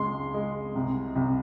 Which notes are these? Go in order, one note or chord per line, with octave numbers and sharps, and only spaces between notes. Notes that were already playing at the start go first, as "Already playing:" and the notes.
Already playing: C#2 G#3 C6
G#3
C2
C2